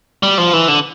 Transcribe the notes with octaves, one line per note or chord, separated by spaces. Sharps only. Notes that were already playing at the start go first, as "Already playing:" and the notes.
G3
F3
E3
D3